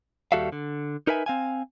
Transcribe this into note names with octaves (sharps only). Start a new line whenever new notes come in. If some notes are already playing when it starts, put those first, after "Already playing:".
D#2 G3 F#4 A4 E5 F5
D3
D#4 A#4 B4 E5 G#5
C4 F5 G#5